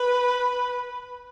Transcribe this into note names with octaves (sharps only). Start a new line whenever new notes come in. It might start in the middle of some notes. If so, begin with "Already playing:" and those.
Already playing: B4